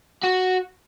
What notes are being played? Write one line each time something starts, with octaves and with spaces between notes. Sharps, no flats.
F#4